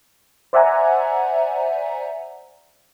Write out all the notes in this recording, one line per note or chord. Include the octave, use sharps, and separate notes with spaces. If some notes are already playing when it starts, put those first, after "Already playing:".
C5 D5 E5 F#5 G#5 A#5